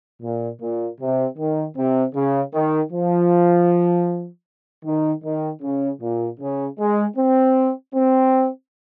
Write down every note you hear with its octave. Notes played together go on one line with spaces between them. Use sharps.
A#2
A#2
C3
D#3
C3
C#3
D#3
F3
D#3
D#3
C#3
A#2
C#3
G#3
C4
C4